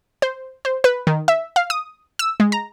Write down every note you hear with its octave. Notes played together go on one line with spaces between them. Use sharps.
C5
C5
B4
D#3
E5
F5
D#6
E6
G#3
A#5